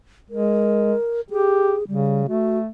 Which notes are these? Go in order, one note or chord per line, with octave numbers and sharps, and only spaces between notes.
G#3 A#4
G4 G#4
C#3 G3
A3 F#4